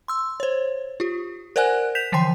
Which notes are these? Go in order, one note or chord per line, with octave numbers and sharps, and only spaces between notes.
C6 E6
C5 C#5
F4 G4
A#4 C5 D5 F#5 G#5 F#6
G6 B6 E7 F7
D3 E3 F3 G5 C6 C7